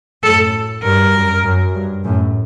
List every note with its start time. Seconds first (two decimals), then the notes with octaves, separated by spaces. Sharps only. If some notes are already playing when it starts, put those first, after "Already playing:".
0.23 F#2 A2 A4
0.83 G2 A#4
1.13 F#2
1.43 F#2
1.75 G2
2.04 F#2 A2